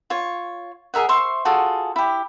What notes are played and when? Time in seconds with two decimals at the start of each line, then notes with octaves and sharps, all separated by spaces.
0.10 F4 C#5
0.94 G#4 A#4 E5 F#5
1.09 C5 E5 C6 C#6
1.45 F4 F#4 G#4 A4
1.96 E4 G4